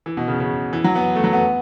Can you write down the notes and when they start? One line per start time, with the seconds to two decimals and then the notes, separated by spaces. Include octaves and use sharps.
0.06 E3
0.17 B2
0.28 C#3
0.40 C#3
0.73 E3
0.84 F#3
0.95 B3
1.16 A3
1.24 F#3
1.33 B3